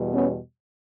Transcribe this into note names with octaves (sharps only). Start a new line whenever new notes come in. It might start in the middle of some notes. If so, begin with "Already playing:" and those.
Already playing: E2 B2 G3
B3 C#4